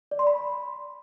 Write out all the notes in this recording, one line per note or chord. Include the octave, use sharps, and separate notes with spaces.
D5
C6
B5